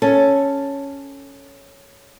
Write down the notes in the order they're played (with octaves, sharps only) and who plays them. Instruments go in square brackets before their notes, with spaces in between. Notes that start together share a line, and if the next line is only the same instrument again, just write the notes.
[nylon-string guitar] C#4 A4